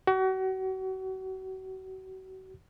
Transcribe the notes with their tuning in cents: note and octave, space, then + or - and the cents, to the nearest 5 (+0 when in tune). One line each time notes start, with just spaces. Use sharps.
F#4 +35